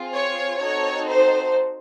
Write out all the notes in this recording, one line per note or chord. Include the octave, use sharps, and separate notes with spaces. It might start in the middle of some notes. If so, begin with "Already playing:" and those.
Already playing: C4 F4 G#4
C#5
C4 D#4 F#4 A4 C#5
C5